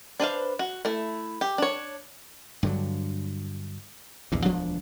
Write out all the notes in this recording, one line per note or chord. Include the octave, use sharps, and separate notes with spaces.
D4 B4 C5 F5
F#4
A3 E4
G4
D4 C#5
G2 D3 F#3
A#1 E2 G2
E1 D2 F3 D4